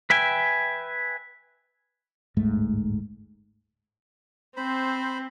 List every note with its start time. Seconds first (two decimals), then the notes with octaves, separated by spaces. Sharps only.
0.10 B4 E5 G5 G#5
2.37 D1 G1 G#2 A3
4.57 C4 C5 B5